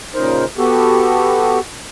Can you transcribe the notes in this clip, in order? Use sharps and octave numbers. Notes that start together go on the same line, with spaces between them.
A#2 C#3 D#4 A#4 C5
B3 F#4 G4 A4